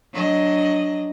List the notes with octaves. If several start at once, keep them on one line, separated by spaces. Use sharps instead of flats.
F#3 D4 D#5